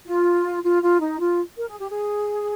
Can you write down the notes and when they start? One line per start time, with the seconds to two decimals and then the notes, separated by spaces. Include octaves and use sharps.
0.07 F4
0.63 F4
0.82 F4
1.00 D#4
1.20 F4
1.57 A#4
1.68 G#4
1.79 G4
1.90 G#4